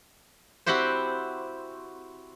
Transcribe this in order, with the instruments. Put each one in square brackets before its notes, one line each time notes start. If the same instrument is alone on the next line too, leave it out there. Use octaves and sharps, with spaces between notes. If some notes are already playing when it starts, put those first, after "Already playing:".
[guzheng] C4 E4 F#4 G4 C5